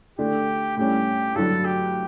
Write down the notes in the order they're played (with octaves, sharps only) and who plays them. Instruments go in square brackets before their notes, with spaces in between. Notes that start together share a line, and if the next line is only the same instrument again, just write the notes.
[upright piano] D3 A3 D4 [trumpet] G4
[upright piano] A2 G3 C#4 [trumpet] G4
[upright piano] G2 D3 F#3 [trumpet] A4
[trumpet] G4